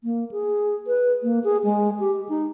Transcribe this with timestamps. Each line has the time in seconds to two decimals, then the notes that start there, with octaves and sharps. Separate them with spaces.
0.04 A#3
0.31 G#4
0.87 B4
1.23 A#3
1.44 G#4
1.64 G#3
2.00 G4
2.29 D#4